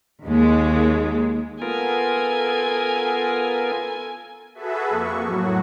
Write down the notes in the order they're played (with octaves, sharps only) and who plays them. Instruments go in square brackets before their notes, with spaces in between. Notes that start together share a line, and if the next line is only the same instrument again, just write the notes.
[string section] D#2 G#3
[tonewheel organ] B3 F4 A#4 [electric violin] A4 G#5
[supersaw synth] F#4 G#4 A4 B4 E5
F2 A#3 C#6
A2 F#3 F#4